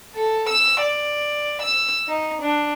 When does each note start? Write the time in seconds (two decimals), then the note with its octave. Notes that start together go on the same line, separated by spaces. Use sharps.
0.15 A4
0.49 E6
0.81 D5
1.62 E6
2.08 D#4
2.42 D4